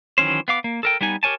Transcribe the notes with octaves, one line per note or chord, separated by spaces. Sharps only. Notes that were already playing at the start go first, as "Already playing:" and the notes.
D#3 E3 F#3 C#4 C5
B3 F5 D6
A#3
A4 A#4 G5
G3 B3 D#4 G#5
G4 A#4 C#5 G#5 A5